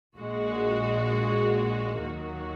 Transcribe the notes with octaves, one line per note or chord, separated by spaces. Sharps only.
A#1 A#2 G#3 F#4
D#2 D#3 F#3 A#3 F#4